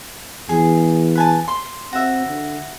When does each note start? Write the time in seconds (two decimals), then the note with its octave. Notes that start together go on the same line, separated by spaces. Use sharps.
0.49 E2 G#4
1.15 B4 G#5 A5
1.48 C6
1.93 C4 F#4 E5
2.27 D3